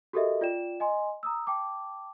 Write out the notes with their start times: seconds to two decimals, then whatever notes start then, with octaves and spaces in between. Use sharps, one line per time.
0.13 F#4 G4 A4 A#4 D#5 E5
0.41 F4 D5 G5 E7
0.80 D#5 G#5 C6
1.23 A#5 D#6 E6
1.47 G5 A5 D6